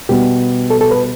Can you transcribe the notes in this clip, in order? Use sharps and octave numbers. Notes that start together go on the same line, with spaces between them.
B2 G3 B3 G4
A4
A4
B4